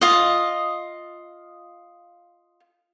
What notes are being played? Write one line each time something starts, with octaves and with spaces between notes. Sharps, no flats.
F4 D#5